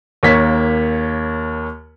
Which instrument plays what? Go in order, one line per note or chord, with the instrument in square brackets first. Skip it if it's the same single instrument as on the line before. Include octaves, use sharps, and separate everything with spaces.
[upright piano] D#2 A#3 C#5 B6